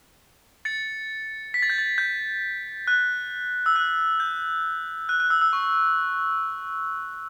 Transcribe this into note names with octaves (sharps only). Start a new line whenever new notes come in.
A6 C#7
B6
A6
G6
A6
G6
F#6
E6
F#6
G6
F#6
F#6
E6
E6
C#6